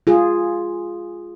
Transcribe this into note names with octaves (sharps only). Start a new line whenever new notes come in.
F4 G#4